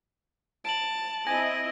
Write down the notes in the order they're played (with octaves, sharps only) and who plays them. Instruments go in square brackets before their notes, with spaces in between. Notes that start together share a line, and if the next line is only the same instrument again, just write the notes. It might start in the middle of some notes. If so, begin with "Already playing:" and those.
[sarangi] A5 [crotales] D7 F#7
[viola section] C4 E4 D#5 [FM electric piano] G#5 [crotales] A#6